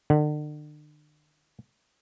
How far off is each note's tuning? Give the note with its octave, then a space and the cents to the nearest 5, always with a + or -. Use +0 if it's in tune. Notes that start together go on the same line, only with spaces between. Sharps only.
D3 +40